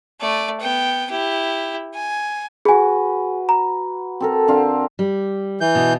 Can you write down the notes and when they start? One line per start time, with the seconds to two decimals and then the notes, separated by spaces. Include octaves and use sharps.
0.21 A3 D5
0.60 B3 G5
1.11 E4 G4
1.94 G#5
2.65 F#4 G#4 B4 G#5
3.49 A#5
4.20 C4 A4 A#4
4.48 D3 C4 F5
4.99 G3
5.61 E3 G6
5.75 B2